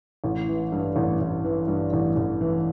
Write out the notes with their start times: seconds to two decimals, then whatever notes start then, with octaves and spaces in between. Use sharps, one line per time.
0.24 A1
0.48 E3
0.72 G2
0.96 A1
1.20 A1
1.44 E3
1.68 G2
1.93 A1
2.16 A1
2.41 E3